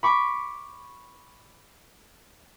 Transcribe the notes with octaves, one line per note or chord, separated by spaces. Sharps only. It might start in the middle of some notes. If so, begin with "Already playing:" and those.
B5 C#6 D6